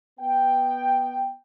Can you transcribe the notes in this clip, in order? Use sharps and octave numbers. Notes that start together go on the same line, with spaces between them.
B3 G5